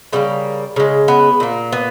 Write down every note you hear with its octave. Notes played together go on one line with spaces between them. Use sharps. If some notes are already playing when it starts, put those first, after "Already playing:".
C#3 G3 A#3 B3
C#3 G#3
B3
A#2 A#3
B3